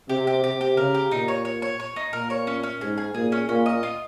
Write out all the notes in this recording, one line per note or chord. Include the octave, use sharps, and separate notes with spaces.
C3 G4
G4
C3 G4
G4
C#3 A#4
G4
A#2 D#4
C#5
C#5
C#5
C#5
D#4
A#2 A#4
C#5
C#4
C#4
G#2 G#4
G#4
A#2 G#4
C#4
A#2 C#4
D#5
F4